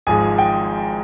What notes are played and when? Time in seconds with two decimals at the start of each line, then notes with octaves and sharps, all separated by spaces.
0.07 G#1 G#2 F3 G#3 G#5
0.38 G5